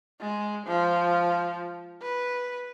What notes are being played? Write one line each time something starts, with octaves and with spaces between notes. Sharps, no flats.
G#3
F3
B4